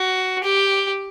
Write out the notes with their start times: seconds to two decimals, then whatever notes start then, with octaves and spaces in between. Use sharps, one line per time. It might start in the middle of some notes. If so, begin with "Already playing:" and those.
Already playing: F#4
0.43 G4